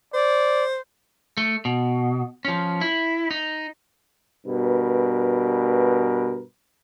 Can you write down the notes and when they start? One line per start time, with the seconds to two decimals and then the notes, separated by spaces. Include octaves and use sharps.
0.14 C5 D5
1.37 A3
1.65 B2
2.45 F3 C#4
2.81 E4
3.31 D#4
4.46 G2 B2 A#4 B4